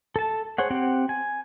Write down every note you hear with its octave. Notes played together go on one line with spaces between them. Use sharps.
A4 A5
G#4 C5 C#5 F#5
C4 G4 F#5
G#5